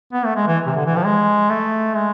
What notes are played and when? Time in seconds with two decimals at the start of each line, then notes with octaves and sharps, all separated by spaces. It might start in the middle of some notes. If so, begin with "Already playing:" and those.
0.13 B3
0.25 A3
0.36 G#3
0.47 E3
0.66 C3
0.76 D3
0.86 E3
0.96 F3
1.05 G#3
1.50 A3
1.96 G#3